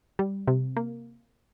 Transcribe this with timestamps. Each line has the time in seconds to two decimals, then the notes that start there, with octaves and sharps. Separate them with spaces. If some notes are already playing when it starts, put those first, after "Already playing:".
0.19 G3
0.48 C3
0.77 A#3